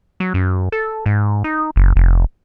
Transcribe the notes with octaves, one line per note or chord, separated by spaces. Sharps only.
F#3
F#2
A4
G#2
D#4
F#1
F1